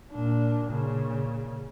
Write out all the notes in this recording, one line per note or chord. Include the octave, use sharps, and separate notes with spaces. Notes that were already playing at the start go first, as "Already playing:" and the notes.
A#2 D4
A#2 C#3